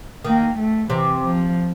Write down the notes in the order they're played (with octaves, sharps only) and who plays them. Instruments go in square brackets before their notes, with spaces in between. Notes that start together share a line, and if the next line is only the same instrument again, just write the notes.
[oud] D#3 [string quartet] A#3
[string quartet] A3
[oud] C3 [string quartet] E3
[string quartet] F3